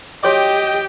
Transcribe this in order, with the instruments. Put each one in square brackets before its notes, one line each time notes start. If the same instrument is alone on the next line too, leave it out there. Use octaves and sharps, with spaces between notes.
[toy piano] F#4 C#5 D6 [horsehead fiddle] G4 [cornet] D#5 [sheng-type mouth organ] G5